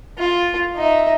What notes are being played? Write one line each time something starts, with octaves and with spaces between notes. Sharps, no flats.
F4
D#4 E5